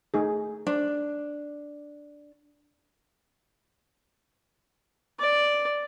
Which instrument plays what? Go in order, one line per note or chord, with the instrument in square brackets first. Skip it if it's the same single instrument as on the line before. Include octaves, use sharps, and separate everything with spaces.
[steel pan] A3 D#4 G#4
[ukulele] D4 [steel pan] C5
[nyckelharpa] D5